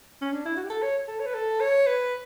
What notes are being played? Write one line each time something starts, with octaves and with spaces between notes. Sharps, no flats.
C#4
D4
E4
F#4
G4
A4
C#5
A4
C#5
B4
A4
C#5
B4